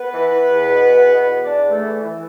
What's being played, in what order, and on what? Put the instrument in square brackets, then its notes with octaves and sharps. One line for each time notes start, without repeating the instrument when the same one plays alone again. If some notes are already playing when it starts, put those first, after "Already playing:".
Already playing: [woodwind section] B3 B4
E3
E3
E2
B2
E2
B2
E2
E2 D4 D5
E2
A3 A4
E3
E3